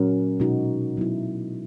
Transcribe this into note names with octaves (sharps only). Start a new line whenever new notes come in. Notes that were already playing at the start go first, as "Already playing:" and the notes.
Already playing: A#2 F#3 C#4 F#4 A#4
B2 G#3 D#4 F#4
F#3 B3 E4